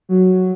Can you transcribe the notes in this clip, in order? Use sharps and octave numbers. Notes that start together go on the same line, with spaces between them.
F#3